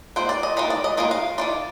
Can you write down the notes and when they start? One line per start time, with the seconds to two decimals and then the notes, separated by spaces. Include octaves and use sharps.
0.16 D#3 A#3 F4 C5
0.29 D5
0.43 D#5
0.57 D#3 A#3 F4 D#5
0.70 D5
0.84 D#5
0.97 D#3 A#3 F4 D#5
1.11 F5
1.38 D#3 A#3 F4 D5